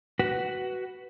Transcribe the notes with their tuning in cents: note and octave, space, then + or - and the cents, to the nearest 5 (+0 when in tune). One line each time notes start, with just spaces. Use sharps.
F#4 +15 B4 +0